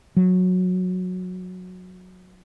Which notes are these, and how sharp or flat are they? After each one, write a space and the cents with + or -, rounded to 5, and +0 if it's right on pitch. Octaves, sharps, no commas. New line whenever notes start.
F#3 -15